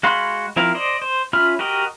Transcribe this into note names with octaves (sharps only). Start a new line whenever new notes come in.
G#3 F#4 F5 B5 C6
F3 C4 E4 A#4 F5
C5 D5 D#5
C5
C#4 F4 E5 B5 F6
F#4 G4 A#4 D#5